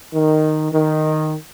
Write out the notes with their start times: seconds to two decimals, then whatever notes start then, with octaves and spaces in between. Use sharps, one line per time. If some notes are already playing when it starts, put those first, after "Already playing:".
0.14 D#3
0.73 D#3